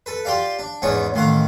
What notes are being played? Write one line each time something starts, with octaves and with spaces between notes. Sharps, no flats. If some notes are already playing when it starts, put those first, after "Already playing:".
A4 B4
F4 G4 D5 F5
D4
E2 G#2 B3 C#4 C#5 C#6
A1 D#3 F5 F#5